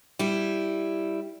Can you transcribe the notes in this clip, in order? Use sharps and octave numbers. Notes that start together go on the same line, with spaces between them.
G3 E4